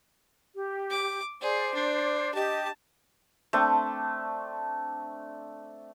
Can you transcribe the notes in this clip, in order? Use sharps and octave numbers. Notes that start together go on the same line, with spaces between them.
G4
D6
G#4 C5 D5
D4
G4 D#5 A5
A3 C4 D4